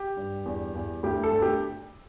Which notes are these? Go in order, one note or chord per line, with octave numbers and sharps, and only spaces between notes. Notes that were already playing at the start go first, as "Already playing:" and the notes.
Already playing: G4
G2
E2
E2
D2 G4
A4
D2
G4